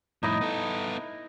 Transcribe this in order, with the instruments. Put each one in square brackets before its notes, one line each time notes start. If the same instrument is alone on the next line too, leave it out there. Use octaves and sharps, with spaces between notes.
[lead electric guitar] F2 A2 [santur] D#4 E4 D#5
[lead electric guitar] B3 A4